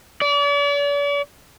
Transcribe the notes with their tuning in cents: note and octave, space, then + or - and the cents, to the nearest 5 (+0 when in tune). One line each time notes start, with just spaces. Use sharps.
D5 -45